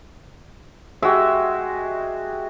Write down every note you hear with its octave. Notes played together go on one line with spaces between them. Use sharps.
G#3 F#4 G4 E5